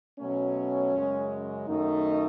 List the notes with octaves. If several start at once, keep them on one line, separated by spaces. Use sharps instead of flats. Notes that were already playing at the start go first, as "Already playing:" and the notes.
B2 F#3 A3 C#4
F#2 C#3 G#3
F#2 D#3 A3 D#4